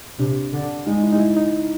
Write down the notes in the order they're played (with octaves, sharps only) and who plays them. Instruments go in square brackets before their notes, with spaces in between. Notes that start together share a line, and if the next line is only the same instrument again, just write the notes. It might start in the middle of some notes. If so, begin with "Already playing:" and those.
[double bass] C3 [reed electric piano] D4
[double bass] D3
[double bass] G#3 [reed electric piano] D#4
[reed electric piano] D#4
E4
D#4
E4
D#4